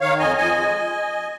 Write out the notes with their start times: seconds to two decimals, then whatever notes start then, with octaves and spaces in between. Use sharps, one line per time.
0.01 D#3 C#5 F5
0.19 F2 D#5 G#5
0.37 F2 D#5 G#5
0.56 G#3